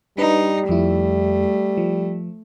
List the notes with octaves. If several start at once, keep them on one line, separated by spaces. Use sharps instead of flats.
G3 D4 D#4 B4
F2 F3 A3 E4
F3